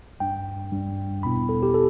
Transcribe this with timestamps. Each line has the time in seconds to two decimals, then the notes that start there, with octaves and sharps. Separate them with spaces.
0.20 G2 G3 D4 G5
0.72 G2 G3 D4
1.23 E2 B2 B3 E4 B5
1.49 A4
1.63 G4
1.74 A4